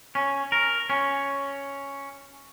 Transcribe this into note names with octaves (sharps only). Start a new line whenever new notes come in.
C#4
A#4
C#4